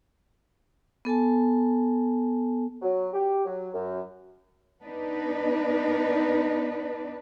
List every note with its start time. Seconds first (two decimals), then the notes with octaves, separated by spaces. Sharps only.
1.05 B3 A4 G#5 A5
2.82 F#3
3.13 G4
3.45 F#3
3.74 F#2
4.82 B3 D4 D#4 B4